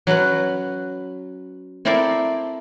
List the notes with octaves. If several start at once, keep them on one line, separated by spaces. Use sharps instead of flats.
F#3 C#4 F#4 B4
C4 E4 A4 A#4 C5 D5